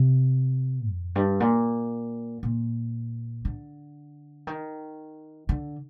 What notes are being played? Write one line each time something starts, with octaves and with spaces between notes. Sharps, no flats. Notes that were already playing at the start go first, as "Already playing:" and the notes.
Already playing: C3
F2
G2
A#2
A#2
D3
D#3
D3